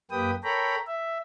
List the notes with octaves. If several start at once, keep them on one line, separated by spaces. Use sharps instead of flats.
F#2 A#3 G4 B4 G5 D#6
A4 A#4 C#5 G5 A#5 B5
E5